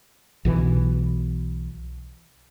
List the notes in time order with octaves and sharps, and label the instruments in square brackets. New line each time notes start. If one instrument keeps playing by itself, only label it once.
[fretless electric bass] B1 B2 E3